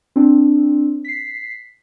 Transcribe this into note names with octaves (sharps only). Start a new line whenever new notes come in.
C4 D4
B6 C7